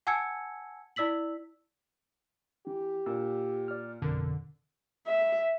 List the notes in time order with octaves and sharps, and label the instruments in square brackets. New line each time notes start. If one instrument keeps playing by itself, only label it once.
[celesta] F#5 G#5 A5 E6 G#6 C#7
E4 D5 E6 B6 F#7
[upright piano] E3 [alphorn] G4
[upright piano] A#2 D4 [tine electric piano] E6
[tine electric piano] D5 F6
[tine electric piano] A1 F2 B2 [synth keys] D3 [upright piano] A#4
[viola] E5